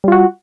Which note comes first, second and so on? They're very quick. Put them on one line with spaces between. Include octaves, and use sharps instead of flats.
G3 F4 F#4